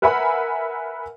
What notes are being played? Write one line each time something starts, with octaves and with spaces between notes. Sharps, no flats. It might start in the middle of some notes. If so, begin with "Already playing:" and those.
A#4 B4 E5 F#5 G#5 B5